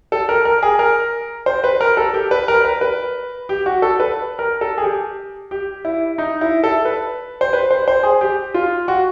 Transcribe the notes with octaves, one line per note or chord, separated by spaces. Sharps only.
A4
A#4
A#4
G#4
A#4
C5
B4
A#4
A4
G4
B4
A#4
B4
B4
G4
F#4
A4
B4
A#4
A4
G#4
G4
G4
E4
D#4
E4
A4
B4
C5
B4
C5
C5
G#4
G4
F4
F#4